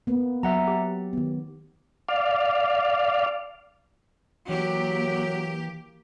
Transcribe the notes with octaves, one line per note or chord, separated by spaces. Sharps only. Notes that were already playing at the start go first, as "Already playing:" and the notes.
A#3 B3
F#3 E5 F#5 A#5
G4
D#3 B3
D5 F5
E3 F#3 A#3 G4